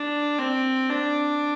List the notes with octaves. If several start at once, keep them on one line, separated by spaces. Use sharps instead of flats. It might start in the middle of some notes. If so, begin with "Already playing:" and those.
Already playing: D4
C4
D4